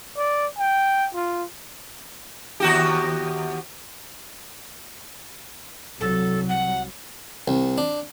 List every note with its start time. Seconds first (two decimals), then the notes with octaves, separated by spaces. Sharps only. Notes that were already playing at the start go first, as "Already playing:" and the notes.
0.17 D5
0.58 G5
1.14 F4
2.60 D#2 F#4 G4
6.00 C2 F#3 A4
6.48 F#5
7.48 C2
7.78 D4